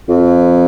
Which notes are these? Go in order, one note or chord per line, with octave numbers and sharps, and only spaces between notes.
F2